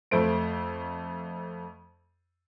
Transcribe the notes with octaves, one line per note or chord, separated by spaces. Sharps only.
F2 A3 C5 D7